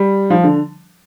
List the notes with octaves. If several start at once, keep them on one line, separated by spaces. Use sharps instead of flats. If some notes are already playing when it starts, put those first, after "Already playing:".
Already playing: G3
F3
D3